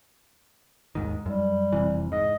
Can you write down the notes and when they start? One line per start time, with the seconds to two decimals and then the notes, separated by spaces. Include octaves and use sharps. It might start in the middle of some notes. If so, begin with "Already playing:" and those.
0.95 D#2 G#2 D#3
1.26 F#2 G3
1.72 F1 C3 E3
2.12 G#2 D#5